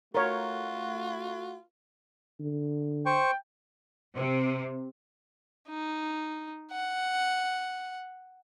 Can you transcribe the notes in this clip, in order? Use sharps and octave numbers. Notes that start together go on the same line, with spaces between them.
A3 F4 F#4 A#4 C#5
D3
C5 G5 C#6
C3
D#4
F#5